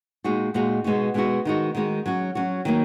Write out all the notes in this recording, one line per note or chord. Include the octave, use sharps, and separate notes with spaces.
A#2 G#3 D#4 F#4
A#2 G#3 D#4 F#4
B2 G#3 B3 D#4 F#4
B2 G#3 B3 D#4 F#4
D#3 G#3 D#4 F#4
D#3 G#3 D#4 F#4
F#3 C#4 F#4
F#3 C#4 F#4
D#3 F#3 A#3 D#4